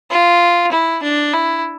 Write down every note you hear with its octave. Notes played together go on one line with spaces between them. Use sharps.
F4
E4
D4
E4